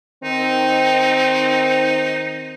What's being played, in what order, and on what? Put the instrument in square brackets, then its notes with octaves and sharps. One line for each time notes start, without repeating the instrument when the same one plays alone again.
[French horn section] D#3 C4 [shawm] D#4